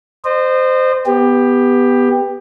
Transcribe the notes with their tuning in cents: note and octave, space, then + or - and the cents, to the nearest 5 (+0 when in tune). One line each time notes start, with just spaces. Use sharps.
C5 -15 D#5 -35
B3 +0 G4 +15